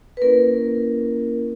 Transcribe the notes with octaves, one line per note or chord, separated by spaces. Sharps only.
B4
A#3 C#4 E4 A#4